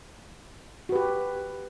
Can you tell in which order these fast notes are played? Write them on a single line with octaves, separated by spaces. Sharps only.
F#4 B4 G4